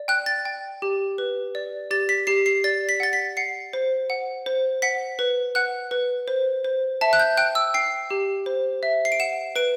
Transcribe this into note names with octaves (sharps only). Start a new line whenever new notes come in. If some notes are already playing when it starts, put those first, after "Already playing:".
Already playing: D5
G5 F#6
A6
G5
G4
B4
D5
G4 A6
B6
G4 C7
C7
D5 A6
B6
F#5 A6
B6
F#5 C7
C5
F#5
C5
F#5 B6
B4
F#5 F#6
B4
C5
C5
E5 A5
F#6
G6
G5 F#6
E6
G5 C7
G4
C5
E5
C7
D7
F#5 E7
B4 D7